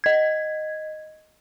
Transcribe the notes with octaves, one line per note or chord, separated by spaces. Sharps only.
D#5 G#6